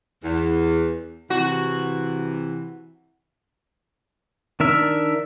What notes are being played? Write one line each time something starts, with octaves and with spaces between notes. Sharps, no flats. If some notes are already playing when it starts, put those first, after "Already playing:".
E2
C3 E3 F#4
D#3 D4 A#4 E5